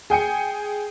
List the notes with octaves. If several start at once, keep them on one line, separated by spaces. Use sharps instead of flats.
G#4 G5 G#5 C#7